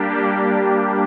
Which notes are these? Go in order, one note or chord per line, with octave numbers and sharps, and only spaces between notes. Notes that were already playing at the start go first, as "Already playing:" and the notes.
Already playing: G3 A#3 D4 G4